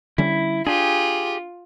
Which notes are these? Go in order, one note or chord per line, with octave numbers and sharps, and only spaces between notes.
D3 G3 C#4 E4
D4 F4 G4 G#4